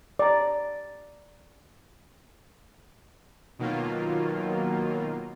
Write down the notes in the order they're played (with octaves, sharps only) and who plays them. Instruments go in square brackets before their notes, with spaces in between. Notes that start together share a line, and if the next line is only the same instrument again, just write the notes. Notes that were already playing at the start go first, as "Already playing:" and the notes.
[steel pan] D5 A#5
[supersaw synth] B2 D#3 F#3 A#3 F4